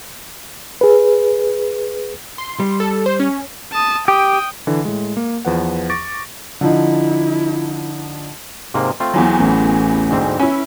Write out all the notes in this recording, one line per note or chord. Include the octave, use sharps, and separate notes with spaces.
G#4 B4
C6
G3
A4
C5
C#4
A5 D#6
G4 G5 D#6
D3 E3
A2 G#3
A#3
E2 F3 B4 F#5
C#6 D6 A6 A#6 D7
D3 F3 D#4 E4
G#2 C3 A#3
A3 C4 F4
E2 E3 F#3
A1
D2 G#2 C4
C#4 E4 B4